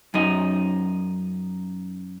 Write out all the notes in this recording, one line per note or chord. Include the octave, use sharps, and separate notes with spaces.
F#2 D#4